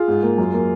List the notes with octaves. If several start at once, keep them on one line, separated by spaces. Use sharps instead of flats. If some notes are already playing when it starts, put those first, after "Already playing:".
Already playing: F4 G#4
G#2
A#3
F#2
A#3